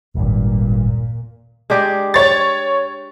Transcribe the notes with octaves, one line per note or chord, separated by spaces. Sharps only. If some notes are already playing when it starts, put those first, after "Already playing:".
D#1 G#1 G2 A#2
G#3 D4 G4
C#5 A6